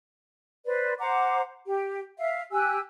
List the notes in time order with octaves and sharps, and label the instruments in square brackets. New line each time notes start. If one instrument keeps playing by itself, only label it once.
[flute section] B4 C5 D5
C5 F#5 A#5 D6
G4
E5 F5
G4 G#5 E6 F#6